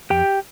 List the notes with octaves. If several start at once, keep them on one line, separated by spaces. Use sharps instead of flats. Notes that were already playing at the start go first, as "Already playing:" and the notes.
F2 G4 G5